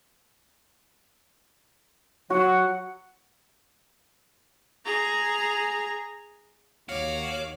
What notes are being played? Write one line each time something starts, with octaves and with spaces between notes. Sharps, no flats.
F#3 F#4 F#5
G#4 A#5
D#2 F#4 C#5 F5 D6